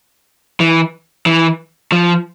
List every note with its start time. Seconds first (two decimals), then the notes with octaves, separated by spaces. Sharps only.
0.60 E3
1.26 E3
1.92 F3